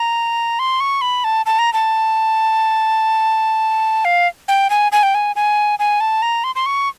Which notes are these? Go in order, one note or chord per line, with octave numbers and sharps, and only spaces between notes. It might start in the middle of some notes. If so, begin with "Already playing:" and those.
Already playing: A#5
C6
C#6
B5
A5
A5
A#5
A5
F5
G5
G#5
G#5
G5
G#5
G#5
G#5
A5
A#5
C6
C6
C#6